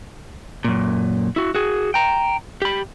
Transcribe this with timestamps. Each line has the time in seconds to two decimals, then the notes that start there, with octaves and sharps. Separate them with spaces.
0.65 F#2 A#2
1.36 E4 F#4
1.55 F#4 G#4
1.94 G5 A#5
2.62 G4 B5